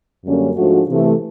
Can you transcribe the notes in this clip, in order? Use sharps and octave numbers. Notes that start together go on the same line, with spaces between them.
F#2 D3 G3 A#3 C#4
G#2 F3 A3 D4 F#4
C3 E3 A3